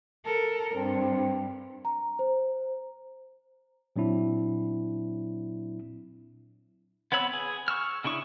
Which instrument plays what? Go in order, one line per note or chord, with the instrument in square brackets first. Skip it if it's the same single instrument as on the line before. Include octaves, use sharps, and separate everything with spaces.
[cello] A4 A#4
[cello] G2 [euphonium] C4
[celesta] A#5
C5
[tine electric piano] A#2 F#3 C4 D4 E4
[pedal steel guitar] B3 C4 C#5 B5 E6
G#4
C#6 E6 F6
C#3 D4 E4 C#6 D#6